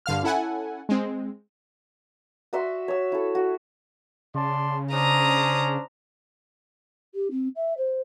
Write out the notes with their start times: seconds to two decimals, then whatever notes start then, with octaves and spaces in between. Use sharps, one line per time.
0.06 G2 D3 F5 F6
0.23 C#4 E4 A4 F#5 G#5
0.89 G#3 C4
2.53 F#4 D5 E5 C6
2.88 C#5 E6
3.12 E4 A4
3.35 F#4
4.35 C#3 D5 A5 C6
4.92 C#4 D4 C5 A#5 D#6
7.14 G4
7.30 C4
7.56 E5
7.77 C5